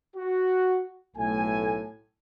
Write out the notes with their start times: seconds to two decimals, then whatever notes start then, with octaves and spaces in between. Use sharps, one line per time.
0.17 F#4
1.17 B1 A2 A3 G#5